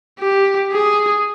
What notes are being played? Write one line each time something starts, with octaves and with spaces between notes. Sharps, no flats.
G4
G#4